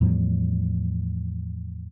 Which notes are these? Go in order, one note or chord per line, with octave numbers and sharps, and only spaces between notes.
E2 A2 F3 G3